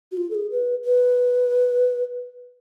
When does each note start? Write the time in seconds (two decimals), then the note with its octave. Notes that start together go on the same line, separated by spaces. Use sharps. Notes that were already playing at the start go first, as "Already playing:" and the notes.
0.12 F#4
0.17 F4
0.30 A4
0.35 G#4
0.51 B4
0.85 B4